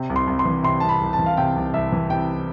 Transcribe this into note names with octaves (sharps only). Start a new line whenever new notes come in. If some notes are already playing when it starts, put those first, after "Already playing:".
Already playing: C3
C2
C6
C2
C6
E3
C3 C6
C2 A5
B5
C2
A5
E3
F5
C3 G5
C2
C2 E5
E3
C3 G5